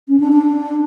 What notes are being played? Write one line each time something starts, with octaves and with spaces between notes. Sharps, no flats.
C#4
D4
D4